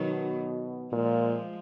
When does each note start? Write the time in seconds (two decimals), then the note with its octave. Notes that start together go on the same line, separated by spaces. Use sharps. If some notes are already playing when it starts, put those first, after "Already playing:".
Already playing: B2 D#3 F#3
0.92 A#2 F3 G#3